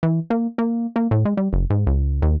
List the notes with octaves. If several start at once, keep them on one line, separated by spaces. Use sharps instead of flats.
E3
A#3
A#3
A#3
A2
G#3
G3
F#1
G#2
C#2
D#2